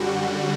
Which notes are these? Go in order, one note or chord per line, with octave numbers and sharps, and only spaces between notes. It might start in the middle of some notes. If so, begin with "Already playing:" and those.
Already playing: F#2 D3 G3 F#4